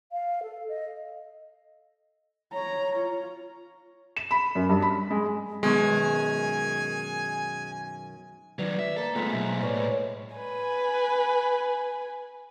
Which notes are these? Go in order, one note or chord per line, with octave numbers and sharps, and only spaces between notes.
F5
A4
D#5
C#5 A#5
F4
E7
B5
F#2
G2
B5
G#3
F#2 B2 D#3 G#3 G#5
D#3 F#3 B4 D5
E5
A#3 A4 C5
G#3 A3 B3 F4 F5 F#5 B6
B1 E5
A2 B4 C#5 D5 F5
B4 G#5